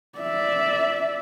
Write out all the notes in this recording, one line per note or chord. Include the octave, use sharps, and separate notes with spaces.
D5 E5